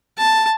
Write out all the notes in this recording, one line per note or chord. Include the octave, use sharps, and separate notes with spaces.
A5